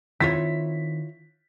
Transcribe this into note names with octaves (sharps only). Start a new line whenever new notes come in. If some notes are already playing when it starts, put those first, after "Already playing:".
D#3 C4 E4 F4 C#5 B6